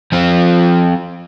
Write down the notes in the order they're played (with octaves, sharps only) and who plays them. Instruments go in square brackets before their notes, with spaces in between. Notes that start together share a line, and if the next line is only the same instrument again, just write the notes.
[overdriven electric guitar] F3 C4